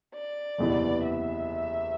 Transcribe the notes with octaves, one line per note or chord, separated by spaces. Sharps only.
D5
F#1 E2 C3 E3 B3
E5